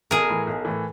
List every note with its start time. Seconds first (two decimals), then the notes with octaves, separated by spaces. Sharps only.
0.11 B1 G#4 A#4
0.29 A2 E3
0.47 B1
0.65 A2 E3